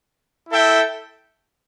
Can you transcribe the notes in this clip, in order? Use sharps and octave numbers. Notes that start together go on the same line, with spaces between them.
E4 A4 E5 G5